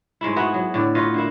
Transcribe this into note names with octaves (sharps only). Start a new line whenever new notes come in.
G#2 G#3 A3 E4
B3 E4 F#4 G#4
F#3
A2 D3 D5
F4 B4 C#5 D#5
D3 A#3 E4